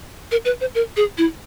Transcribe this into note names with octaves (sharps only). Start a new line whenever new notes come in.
A#4
B4
C5
A#4
G#4
E4